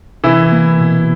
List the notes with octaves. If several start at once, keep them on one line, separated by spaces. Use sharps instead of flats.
C3 E3 E4
A#3
B2